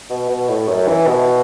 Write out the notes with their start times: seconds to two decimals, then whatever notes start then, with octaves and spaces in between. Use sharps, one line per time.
0.10 B2
0.29 B2
0.49 A2
0.68 F#2
0.88 E3
1.07 B2